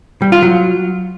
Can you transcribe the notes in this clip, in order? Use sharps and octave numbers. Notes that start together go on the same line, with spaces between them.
G3
F4
F#3